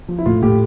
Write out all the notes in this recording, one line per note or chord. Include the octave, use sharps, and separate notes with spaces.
F3
E4
A2 F4
A2 G4